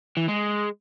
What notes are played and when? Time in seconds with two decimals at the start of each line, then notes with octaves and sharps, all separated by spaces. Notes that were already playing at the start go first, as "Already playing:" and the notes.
0.17 E3
0.28 G#3